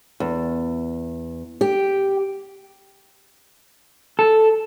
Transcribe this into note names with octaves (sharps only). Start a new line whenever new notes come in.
E2
G4
A4